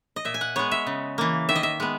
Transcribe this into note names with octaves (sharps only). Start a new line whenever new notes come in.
D#5
A#2 E5
G#5
F#5
G#3 B3 C#5
E5
C#3
E3 A#3
D#3 E5
D#5
E5
G#3 B3